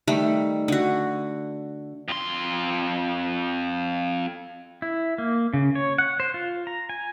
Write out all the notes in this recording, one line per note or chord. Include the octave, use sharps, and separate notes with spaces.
D#3 G3 A3
D3 F#4
F2 C6
E4
A#3
C#3
C#5
F#5
C5
F4
A#5
G#5